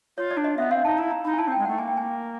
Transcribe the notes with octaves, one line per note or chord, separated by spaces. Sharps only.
F4 C#5
D5
D4
D#5
B3 E5
C4 F5
D#4 A5
E4 A#5
A#5
D#4 B5
G#5
E4 A5
C4 G5
G#3
A3 F#5
A#3 G#5
G5
G#5